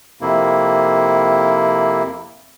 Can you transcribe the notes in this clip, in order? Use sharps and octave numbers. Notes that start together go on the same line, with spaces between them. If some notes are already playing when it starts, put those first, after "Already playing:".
F2 C3 A#3 E4